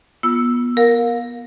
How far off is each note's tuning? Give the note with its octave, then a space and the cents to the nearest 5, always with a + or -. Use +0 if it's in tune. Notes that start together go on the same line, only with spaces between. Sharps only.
B3 -25 F4 +0 E6 +0
A#4 +0 F5 +30